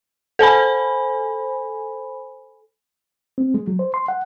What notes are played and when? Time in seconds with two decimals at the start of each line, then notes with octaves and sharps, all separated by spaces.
0.39 A4 C5 G#5 B5
3.38 C4
3.54 G#3
3.68 F#3
3.79 C5
3.94 C6
4.08 F#5